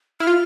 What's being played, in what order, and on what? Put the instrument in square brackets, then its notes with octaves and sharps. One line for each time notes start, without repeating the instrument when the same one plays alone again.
[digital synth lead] E4 [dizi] F6
[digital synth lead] F4